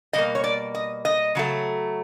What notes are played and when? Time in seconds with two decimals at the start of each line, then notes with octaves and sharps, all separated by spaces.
0.13 B2 G3 A#3 D#5
0.35 C#5
0.44 D5
0.75 D#5
1.05 D#5
1.35 C#3 F#3 A3